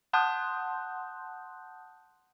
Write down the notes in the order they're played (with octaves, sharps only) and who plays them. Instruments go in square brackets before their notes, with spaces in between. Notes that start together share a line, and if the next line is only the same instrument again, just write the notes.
[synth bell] F#5 A5 C6 D#6 F#6 G6